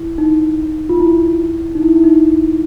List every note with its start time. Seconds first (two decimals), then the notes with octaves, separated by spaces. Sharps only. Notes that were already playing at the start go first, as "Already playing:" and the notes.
Already playing: E4
0.18 D#4
0.89 F4
1.00 E4
1.75 D#4
1.83 E4
1.96 E4
2.04 D#4